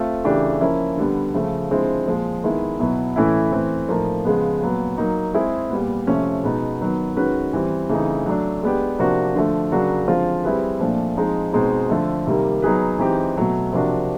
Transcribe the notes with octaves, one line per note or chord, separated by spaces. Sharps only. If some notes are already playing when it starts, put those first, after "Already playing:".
Already playing: A3 C4 F4 A4
C#3 E3 A3 D4 G4
F3 A#3 C#4 E4
D3 G3 B3
C#3 F3 A3
D3 F3 G#3 C4 E4
A#2 F3 G#3
D#3 G#3 B3 E4
B2 F#3 B3 E4
A2 E3 A3 C#4 E4
E3 A3 C4
A2 F3 A#3 D#4
C#3 F3 G#3 B3
A#2 F#3 B3
F#3 A#3 D#4
G#3 C4 E4 G#4
A#2 G3 B3
C3 F3 A3 C#4
B2 G#3 B3 D#4
D#3 F#3 B3
D#3 G#3 C#4 F#4 B4
E3 G3 C4
C#3 E3 A3 C4 D#4
F#3 A3 D4
G#3 B3 D4 G4
C3 F3 A#3 D4 F#4
D3 F3 A3
C#3 F#3 A#3 D4 F#4
D3 F3 G#3 C4 F4
G3 C4 E4 G#4 B4
A#2 F3 A3 D4
F3 G#3 C4 D#4
B2 G#3 C4 D#4
D3 F3 A3
C3 D#3 G3 A#3
F#3 B3 D#4 G#4 B4
E3 G#3 C4 D#4 G4
B2 F#3 A3
C3 F3 A#3 D4 F#4